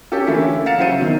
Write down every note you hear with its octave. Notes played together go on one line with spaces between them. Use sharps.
C#4 G4 A4
D3 E3 A3 A#3 C#4 E4
F5 F#5 A#5 A6 C#7 E7
C#3 F#3 E4 C5 C#7 D#7
B2 D#3